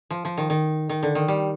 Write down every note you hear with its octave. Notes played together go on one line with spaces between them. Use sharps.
F3
F3
D#3
D#3
D#3
D3
D#3
G3